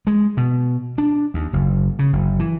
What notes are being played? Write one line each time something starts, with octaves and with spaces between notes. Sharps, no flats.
G#3
B2
D4
D#2
F#1
C#3
F#1
E3